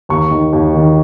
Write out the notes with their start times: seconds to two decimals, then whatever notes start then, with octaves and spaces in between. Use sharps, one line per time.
0.09 D#2 C#6
0.31 D#3
0.53 D#2
0.74 D#3